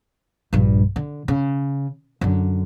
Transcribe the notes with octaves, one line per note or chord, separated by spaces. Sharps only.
A#1 G2
D3
C#3
F#2 D3